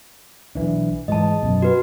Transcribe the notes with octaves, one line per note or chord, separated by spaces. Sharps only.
B1 E3 D4
G#2 E3 G#3 D#5 A5
F#2 B2
F#4 B4